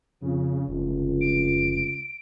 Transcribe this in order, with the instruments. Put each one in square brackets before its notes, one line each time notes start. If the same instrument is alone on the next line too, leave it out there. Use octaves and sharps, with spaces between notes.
[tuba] F2 [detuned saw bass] C#3
[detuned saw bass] F1 [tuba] C#2
[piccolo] D7